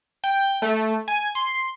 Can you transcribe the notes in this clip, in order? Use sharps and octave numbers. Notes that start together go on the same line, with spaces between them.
G5
A3
G#5
C6